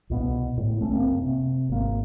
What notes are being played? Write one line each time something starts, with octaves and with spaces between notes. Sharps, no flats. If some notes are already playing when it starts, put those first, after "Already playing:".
C2 B2 B3
A2
B1 A3 C4 C#4
F#1 A#3 C4
C3
G#1 A#3